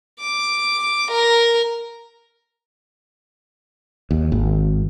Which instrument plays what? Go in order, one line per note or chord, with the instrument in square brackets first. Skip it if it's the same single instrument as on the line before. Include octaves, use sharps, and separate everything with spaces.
[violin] D6
A#4
[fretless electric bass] D#2
G#1